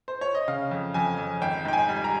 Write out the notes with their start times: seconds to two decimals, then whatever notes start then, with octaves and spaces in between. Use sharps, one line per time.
0.08 C5
0.21 C#5
0.35 D#5
0.48 C#3 F5
0.71 F2
0.94 F2 G#5
1.18 F2
1.41 G#1 G5
1.65 G#2 G5
1.73 G#5
1.89 G3
2.04 A#5